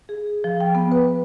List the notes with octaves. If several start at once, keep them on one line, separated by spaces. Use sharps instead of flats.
G#4
F3
G5
B3
B4